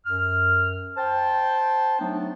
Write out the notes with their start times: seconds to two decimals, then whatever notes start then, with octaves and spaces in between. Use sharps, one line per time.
0.06 F#2 F6
0.97 C5 G5 A5
1.99 F#3 A3 B3 D4 D#4